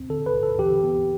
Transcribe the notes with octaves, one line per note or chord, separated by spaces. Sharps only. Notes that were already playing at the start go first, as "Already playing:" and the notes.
Already playing: C4
D3 A4
B4
D3
A4
E3 G4
B3